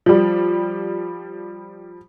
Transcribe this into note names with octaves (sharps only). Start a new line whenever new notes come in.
F3 G3